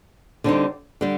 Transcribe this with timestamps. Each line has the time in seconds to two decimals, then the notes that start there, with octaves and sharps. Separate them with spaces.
0.44 D3 G3 C4 D#4
1.01 D3 G3